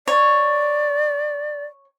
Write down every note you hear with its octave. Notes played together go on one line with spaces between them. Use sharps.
C#5 D5